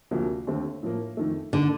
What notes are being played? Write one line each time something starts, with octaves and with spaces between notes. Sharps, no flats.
D2 C3 F3 A#3 D4
D#2 D3 A3 C4
A2 F3 A#3
F2 D#3 A3
D3 D#3 A#3